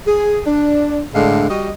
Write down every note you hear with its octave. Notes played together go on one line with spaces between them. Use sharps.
G#4
D4
A2 D3 G#3 D4 F5
G3 F#4 D#5